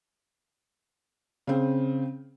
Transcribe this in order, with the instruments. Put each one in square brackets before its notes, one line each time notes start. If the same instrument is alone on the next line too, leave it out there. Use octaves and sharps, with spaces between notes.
[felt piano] C#3 C4